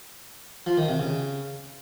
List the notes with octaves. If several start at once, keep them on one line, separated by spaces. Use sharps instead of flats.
F3
D#3
C3
C#3